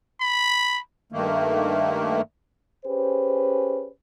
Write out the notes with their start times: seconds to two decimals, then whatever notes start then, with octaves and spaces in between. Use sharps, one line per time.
0.21 B5
1.12 G2 D#3 A3 A#3
2.85 C#4 G4 G#4 B4 C5